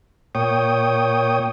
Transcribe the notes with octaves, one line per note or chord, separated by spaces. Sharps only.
A#2 C#5 G5 D#6